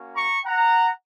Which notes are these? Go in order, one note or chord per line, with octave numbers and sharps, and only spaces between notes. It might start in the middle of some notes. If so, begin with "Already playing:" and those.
Already playing: A#3 C#4 F#4
A#5 C#6
F#5 A#5